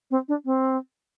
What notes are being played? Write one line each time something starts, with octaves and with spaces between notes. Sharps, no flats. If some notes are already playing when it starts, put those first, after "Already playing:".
C4
D4
C4